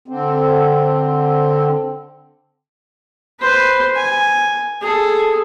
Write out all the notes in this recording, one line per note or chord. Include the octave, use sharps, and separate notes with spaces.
D3 C4
B4 C5
G#5
G#4 A4